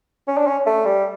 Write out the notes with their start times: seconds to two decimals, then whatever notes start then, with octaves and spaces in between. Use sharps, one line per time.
0.28 C#4
0.38 D4
0.47 C#4
0.66 A3
0.85 G3